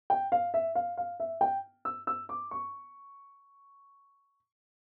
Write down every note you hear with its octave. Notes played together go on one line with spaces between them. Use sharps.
G5
F5
E5
F5
F5
E5
G5
E6
E6
D6
C#6